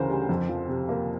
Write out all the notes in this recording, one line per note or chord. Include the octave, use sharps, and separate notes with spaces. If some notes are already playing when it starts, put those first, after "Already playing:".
Already playing: D2 C#3 E3 A#4 C5
G3
F2
F3
C3
A#3